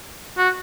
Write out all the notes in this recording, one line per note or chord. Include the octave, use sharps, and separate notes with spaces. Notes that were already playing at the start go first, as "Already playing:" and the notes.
F#4